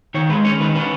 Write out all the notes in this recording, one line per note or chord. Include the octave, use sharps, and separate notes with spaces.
D#3 C#5
G#3 B4
C#4 C#5
D#3 B4
C#4 B4